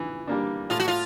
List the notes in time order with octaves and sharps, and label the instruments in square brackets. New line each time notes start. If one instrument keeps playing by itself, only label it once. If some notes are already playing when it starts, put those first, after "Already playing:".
Already playing: [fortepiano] E3
G3 A#3 D4
[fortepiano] A2 [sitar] F4
[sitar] F#4
F4